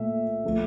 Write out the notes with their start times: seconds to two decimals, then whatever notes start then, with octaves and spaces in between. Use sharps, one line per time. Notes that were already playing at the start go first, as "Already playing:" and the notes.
Already playing: A#2 A3 E5
0.44 A#2 F3 A3